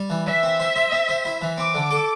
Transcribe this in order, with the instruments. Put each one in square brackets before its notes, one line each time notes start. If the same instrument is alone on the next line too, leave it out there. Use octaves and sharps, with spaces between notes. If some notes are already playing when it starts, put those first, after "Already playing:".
Already playing: [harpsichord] G3
E3
[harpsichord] E3 [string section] E5
[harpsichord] C4
C5
C5
C4
C5
E4
E3
[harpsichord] C4 [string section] D6
[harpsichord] D3
A4